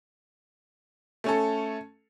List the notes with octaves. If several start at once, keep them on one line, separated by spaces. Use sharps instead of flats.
A3 C#4 A4